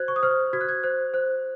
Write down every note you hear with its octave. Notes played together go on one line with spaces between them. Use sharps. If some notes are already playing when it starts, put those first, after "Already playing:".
Already playing: F#4 C5 F#6 G#6
C#6
D#6
C5 F6
F#4 G#6
F#6
G#6
C5 F#6
C5 F#6